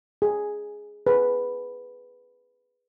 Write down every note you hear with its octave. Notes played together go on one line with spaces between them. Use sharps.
G#4
G#4 B4